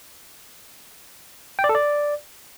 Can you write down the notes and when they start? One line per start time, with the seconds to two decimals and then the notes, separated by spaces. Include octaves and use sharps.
1.59 G5
1.64 D5
1.69 A4
1.75 D5